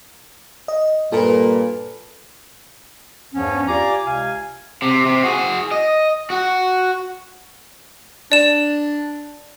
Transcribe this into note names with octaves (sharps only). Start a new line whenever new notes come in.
D#5
G2 A#2 A4 B4
E2 G2 F3 B3 C#4
F4 G4 D5 G#5 A#5 D6
C#2 C3 F5 G#5
C3
C3
F#4 G#4
D#5
F#4
D4 D5 E7